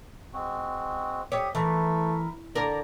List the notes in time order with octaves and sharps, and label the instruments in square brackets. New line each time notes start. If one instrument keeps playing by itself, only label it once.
[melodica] G#3 C4 F#4
[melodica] G4 E5 D#6 [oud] C#5
[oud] E3 [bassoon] A3 [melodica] E4 A#4
[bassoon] D3 [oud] A#4 [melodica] D5 A#5